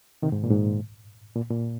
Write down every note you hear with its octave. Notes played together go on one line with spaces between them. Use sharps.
C3 D#3
G#2
A#2
G#2
A#2
A#2